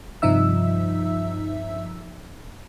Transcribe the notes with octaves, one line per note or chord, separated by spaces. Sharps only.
G2 C3 F3 D#4 E5 E6